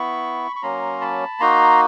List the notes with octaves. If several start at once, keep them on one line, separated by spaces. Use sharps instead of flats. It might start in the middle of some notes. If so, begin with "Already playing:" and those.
Already playing: B3 E4 B5 C#6
C#6
F#3 A#3 C#4 A#5 C6
A5 B5
A#3 D#4 F#4 A#5 C6